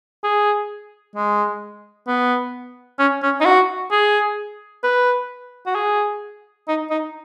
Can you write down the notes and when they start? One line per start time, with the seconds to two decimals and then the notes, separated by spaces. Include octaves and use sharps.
0.23 G#4
1.15 G#3
2.07 B3
2.99 C#4
3.23 C#4
3.40 D#4
3.45 F#4
3.91 G#4
4.83 B4
5.66 F#4
5.75 G#4
6.68 D#4
6.90 D#4